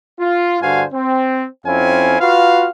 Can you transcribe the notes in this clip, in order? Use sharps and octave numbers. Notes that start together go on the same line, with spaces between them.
F4
G2 D3 F#4 C5 F5 G#5
C4
F2 C4 C#4 E4 F5 G#5
F4 F#4 B4 F5